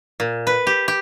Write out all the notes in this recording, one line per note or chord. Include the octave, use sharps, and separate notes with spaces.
A#2
B4
G4
G4